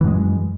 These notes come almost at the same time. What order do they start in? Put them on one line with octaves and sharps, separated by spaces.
E3 F#2 G#3